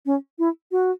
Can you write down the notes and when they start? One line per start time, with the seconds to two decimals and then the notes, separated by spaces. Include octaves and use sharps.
0.06 C#4
0.39 E4
0.72 F#4